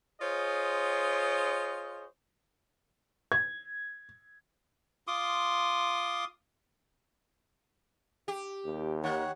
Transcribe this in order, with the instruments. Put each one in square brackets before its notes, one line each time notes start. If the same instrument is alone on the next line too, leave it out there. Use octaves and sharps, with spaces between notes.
[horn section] F4 G#4 C5 C#5 D#5
[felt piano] G#6
[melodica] F4 C6 D6 D#6
[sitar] G4
[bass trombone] D#2
[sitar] D#3 [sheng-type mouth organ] C#5 F#5